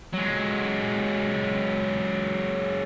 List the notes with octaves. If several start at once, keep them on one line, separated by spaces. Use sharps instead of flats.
F#3 G#3